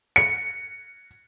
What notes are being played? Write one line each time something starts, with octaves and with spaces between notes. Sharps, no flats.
C#7